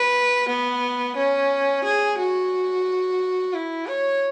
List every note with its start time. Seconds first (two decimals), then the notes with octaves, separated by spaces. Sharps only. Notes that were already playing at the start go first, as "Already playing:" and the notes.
Already playing: B4
0.49 B3
1.16 C#4
1.84 G#4
2.19 F#4
3.53 E4
3.87 C#5